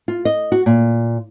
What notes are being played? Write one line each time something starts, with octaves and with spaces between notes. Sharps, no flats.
F4
D#5
F#4
A#2